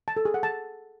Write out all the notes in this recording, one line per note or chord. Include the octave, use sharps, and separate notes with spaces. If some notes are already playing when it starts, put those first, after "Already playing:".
A5
A4
G#4
F#5
A5